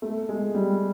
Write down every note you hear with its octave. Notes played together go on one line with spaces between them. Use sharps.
A3
G#3
G3